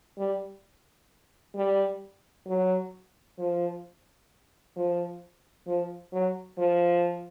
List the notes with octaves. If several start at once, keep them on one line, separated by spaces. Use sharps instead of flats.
G3
G3
F#3
F3
F3
F3
F#3
F3